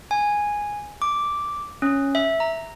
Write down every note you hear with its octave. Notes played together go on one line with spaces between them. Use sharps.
G#5
D6
C#4
E5
A#5